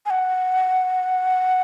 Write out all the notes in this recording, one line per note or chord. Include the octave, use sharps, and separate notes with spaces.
G#5
F#5